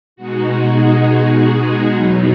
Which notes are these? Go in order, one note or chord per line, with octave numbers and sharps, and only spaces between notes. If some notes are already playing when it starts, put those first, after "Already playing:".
B2 G#3 D#4 F#4
G#4
G#4
E2 B2 F#3 B3 D#4